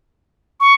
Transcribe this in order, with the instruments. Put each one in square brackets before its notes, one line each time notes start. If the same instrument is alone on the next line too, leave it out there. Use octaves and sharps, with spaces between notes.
[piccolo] C#6